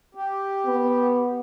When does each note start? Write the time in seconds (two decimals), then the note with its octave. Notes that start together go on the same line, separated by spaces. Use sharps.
0.15 G4
0.66 B3